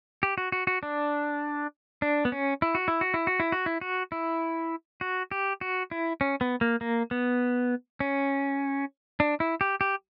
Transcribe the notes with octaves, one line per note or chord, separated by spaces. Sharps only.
G4
F#4
F#4
F#4
D4
D4
B3
C#4
E4
F#4
E4
F#4
E4
F#4
E4
F#4
E4
F#4
E4
F#4
G4
F#4
E4
C#4
B3
A#3
A#3
B3
C#4
D4
E4
G4
G4